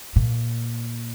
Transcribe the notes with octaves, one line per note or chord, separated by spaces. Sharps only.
A#2